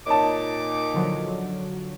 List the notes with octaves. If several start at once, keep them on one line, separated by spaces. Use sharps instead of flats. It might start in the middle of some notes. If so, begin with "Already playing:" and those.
A#2 D#4 C#5 A5 D6
D3 F3 F#3